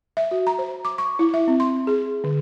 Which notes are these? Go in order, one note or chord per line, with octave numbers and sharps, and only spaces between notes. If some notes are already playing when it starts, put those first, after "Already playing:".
E5
F#4
A#5
C5
D6
C#6
E4
E5
C4
C6
G#4
D3